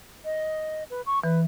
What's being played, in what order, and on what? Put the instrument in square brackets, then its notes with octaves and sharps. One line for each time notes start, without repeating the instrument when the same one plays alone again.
[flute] D#5
B4
C#6
[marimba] E3 [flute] B4